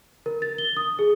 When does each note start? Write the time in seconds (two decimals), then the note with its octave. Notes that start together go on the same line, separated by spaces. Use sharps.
0.26 A#4
0.42 A6
0.58 G7
0.77 D#6
0.99 G#4